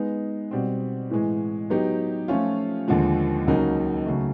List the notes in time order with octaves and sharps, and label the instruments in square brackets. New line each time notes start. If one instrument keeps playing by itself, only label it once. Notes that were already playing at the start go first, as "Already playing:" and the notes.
Already playing: [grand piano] G#3 B3 D#4
B2 G3 C4
A2 E3 G#3
F#3 B3 D#4 G4
F3 A3 C#4 F4
D#2 D3 F3 G#3
C#2 C#3 F#3 A#3 D#4
C#3 F#3 A3